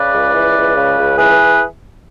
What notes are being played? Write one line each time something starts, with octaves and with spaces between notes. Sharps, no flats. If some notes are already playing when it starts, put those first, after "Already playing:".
Already playing: C#3 B4 D5
C#2
E3
C#2
C#3
C#2
E3 G#4 B4